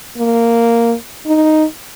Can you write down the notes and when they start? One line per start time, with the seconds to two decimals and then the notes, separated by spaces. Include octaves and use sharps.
0.18 A#3
1.27 D#4